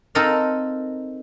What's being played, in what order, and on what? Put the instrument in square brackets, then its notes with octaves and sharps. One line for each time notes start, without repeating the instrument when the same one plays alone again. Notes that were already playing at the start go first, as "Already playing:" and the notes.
[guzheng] C4 D#4 A4 A#4 D#5 F5